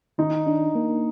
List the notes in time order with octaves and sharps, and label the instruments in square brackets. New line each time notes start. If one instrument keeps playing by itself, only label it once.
[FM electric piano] D#3 [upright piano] D#4
[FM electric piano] D4
A#3